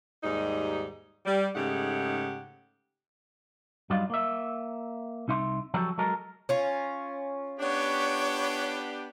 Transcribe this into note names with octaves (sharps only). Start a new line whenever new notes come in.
D#2 G#2 G3 D#4
G3
G#2 C#3 A3 D#4 G4 F#5
G2 F#3 G3 D#4 F4
A#3 E5
C2 D#4 E5 C6
F3 F#3 G4 A4 C#5
F#3 G#3 A4 A#4
C#4 F4
B3 D4 G4 C#5